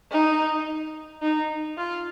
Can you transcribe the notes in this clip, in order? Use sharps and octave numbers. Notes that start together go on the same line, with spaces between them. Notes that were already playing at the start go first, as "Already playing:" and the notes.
D#4
D#4
F4